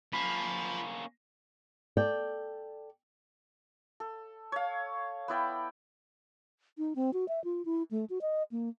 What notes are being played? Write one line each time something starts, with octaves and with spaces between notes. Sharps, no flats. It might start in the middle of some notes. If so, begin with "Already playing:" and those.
A#3 C#4 F4 A5 B5
A4 D5 G5
A4
C#5 F5
B3 E4 D5 G5
D#4
C4
F#4
E5
F4
E4
A3
F#4
D#5
A#3